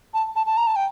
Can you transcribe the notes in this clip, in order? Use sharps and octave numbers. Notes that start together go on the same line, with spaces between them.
A5
A5
A5
A#5
A5
G5